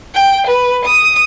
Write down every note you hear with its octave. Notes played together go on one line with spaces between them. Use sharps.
G5
B4
D#6